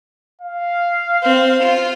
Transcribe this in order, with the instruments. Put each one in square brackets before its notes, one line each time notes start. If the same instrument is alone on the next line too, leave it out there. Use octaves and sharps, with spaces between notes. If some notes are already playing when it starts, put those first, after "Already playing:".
[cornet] F5
[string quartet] C4 C5
F4